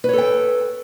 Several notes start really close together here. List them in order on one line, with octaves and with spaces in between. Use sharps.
B4 C#5 A4 G5